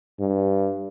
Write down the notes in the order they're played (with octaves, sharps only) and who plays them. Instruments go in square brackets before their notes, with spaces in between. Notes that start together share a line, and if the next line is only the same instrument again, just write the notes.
[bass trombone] G2